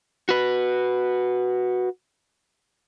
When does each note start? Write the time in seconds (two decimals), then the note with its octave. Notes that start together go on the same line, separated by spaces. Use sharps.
0.29 F#4 B4